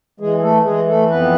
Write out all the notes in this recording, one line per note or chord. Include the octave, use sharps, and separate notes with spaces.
E3 G#3 G#4
G#4
A3 A4
E3 G#3 G#4
A3 A4
F2 B3 B4